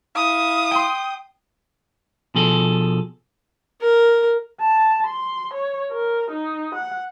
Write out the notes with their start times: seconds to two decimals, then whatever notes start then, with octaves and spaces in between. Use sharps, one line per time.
0.16 E4 F5 D#6
0.71 G5 C6
2.35 B2 F3 G#4 A4
3.81 A#4
4.61 A5
5.07 C6
5.54 C#5
5.91 A#4
6.31 D#4
6.75 F#5